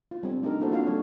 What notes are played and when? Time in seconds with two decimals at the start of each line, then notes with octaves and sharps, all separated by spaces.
0.11 F4
0.23 G3 C4
0.42 A3 D4 D#4 G4 A#4
0.60 A#3 D4 E4 F#4 A4 C5
0.71 A#3 C4 D4 F4 F#4 F5
0.87 G3 D#4 A4 C#5